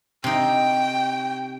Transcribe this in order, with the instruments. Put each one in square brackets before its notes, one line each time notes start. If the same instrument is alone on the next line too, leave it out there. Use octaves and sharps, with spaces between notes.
[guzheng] C3 D#4 [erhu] G5